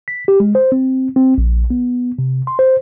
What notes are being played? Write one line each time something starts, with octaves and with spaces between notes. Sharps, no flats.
B6
G4
G#3
C5
C4
C4
A#1
B3
C3
C6
C5